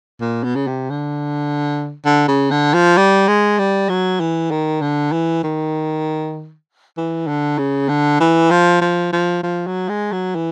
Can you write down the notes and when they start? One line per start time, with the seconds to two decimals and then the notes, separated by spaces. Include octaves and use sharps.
0.21 A#2
0.43 B2
0.55 C#3
0.67 C3
0.90 D3
2.05 D3
2.28 C#3
2.51 D3
2.74 F3
2.97 G3
3.27 G#3
3.59 G3
3.89 F#3
4.20 E3
4.51 D#3
4.81 D3
5.12 E3
5.44 D#3
6.97 E3
7.27 D3
7.58 C#3
7.89 D3
8.20 E3
8.50 F3
8.81 F3
9.12 F3
9.43 F3
9.67 F#3
9.89 G#3
10.12 F#3
10.35 E3